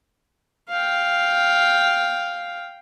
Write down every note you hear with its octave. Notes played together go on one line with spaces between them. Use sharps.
F5 G5